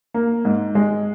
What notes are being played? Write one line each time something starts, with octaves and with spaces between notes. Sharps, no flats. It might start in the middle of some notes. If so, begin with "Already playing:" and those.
A#3
G#2
G#3